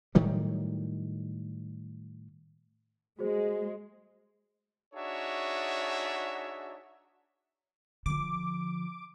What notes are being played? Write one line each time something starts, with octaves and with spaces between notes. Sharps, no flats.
A2 D#3 F#3 G3
G#3 F#4 G#4 C5
D4 D#4 F#4 G#4 C#5 E5
D3 F3 D6